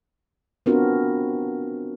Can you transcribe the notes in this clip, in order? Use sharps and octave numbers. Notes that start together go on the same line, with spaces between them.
B3 C4 D4 F4 F#4 A#4